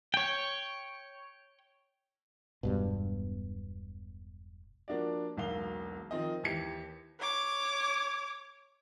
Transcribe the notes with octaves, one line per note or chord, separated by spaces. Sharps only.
C#5 G5
E1 G2 B2
F3 A#3 D4 F#4 D5
E1 B1 A#3 F5 G7
D#3 F3 C4 D#5
D#2 E3 G4 G#6 C#7
C#5 D6